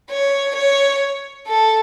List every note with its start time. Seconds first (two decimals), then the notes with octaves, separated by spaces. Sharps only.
0.11 C#5
0.56 C#5
1.48 A4